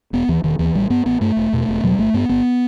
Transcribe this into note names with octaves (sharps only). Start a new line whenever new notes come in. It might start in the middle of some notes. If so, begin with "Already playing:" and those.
E1 B3
D#2 E3
E1 D#3
D#2 E3
A1 G3
G2 B3
A1 B3
G2 A3
E1
E2 B2
E1
E2 B2 F#3
G3
G1 A3
G2 B3
G1 B3